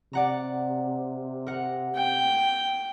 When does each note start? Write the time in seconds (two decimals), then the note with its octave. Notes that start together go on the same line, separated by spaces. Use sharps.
0.13 C3 D5 F#5 A#5
1.47 A#4 F#5
1.95 G5